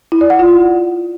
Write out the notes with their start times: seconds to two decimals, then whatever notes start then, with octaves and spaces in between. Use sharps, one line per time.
0.12 E4
0.21 D5
0.30 F#5
0.39 F4